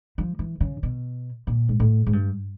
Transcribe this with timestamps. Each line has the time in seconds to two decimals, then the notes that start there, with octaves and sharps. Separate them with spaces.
0.18 F3
0.39 E3
0.60 C#3
0.83 B2
1.47 A#2
1.69 G#2
1.80 A2
2.07 G#2
2.13 G2